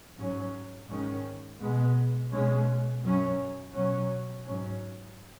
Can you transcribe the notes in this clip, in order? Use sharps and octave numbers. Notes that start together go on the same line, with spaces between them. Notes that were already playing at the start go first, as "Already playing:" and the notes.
G#2 F#3 C#4
G#2 D#3 G#3 C#4
B2 G#3 B3
B2 G#3 C#4
F#2 F#3 C#4
B2 F#3 C#4
G#2 F#3 C#4